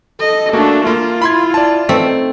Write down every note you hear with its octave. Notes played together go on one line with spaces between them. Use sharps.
A4 D#5
A3 A#3 D4 F#4
A#3 F4
E4 B5 C6 G#6
D5 A5
A3 C4 D#4 A4